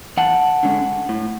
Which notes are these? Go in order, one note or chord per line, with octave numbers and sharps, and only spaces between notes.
E2 F#5 A5
D3 G#3 C#4
A2